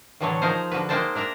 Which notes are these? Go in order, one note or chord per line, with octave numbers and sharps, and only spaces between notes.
A2 D3 E3 F#3 A3 C#5
F3 D#4 G#4 A#4 C5
D3 F3 F#4 B4
G#3 A#3 D#4 C5 G5 A5
D4 A#4 E5 A#5